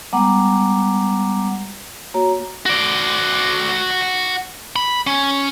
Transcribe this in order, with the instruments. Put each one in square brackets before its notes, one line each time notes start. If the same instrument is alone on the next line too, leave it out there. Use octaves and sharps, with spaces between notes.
[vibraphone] G3 G#3 B3 F#5 A#5 D6
A#3 F#4 C#5 A#5
[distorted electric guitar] F#4 D5
B5
C#4